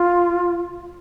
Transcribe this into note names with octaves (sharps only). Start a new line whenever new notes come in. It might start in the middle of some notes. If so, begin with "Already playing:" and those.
Already playing: F4